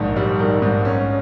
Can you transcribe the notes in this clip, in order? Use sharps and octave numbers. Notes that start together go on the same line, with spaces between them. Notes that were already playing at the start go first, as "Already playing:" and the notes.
Already playing: A#1 G#2 D#3
G3
D#3
G#2
C#4